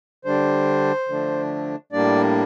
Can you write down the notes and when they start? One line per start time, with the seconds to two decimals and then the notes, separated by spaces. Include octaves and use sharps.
0.25 D3 G3 D4 C5
1.08 D3 F3 A3 D4
1.92 A2 G3 A#3 D4 D5